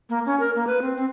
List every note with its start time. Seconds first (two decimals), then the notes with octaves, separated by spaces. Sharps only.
0.09 A#3
0.26 C#4
0.39 A#4
0.55 A#3
0.67 B4
0.81 C4
0.96 C4